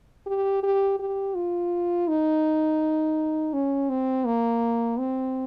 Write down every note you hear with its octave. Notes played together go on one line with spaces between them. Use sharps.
G4
G4
G4
F4
D#4
C#4
C4
A#3
C4